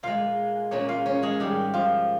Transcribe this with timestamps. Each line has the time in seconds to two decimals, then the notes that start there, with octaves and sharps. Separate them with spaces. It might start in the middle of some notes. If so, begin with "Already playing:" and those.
0.03 A#2 G#3 F4 F5
0.71 A#2 G#3 C#4 C#5
0.89 F4 F5
1.06 C#4 C#5
1.23 G#3 G#4
1.40 G#2 D#3 G3 G#3 G4
1.74 F3 F4